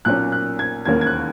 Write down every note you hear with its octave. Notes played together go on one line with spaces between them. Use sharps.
B1 A#2 A#3 C#4 F#6
F#6
G#6
E1 D#2 D#3 A#3 C#4 G#6
G#6
F#6